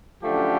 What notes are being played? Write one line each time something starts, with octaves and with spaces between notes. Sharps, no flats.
F#2 D3 F3 A3 G4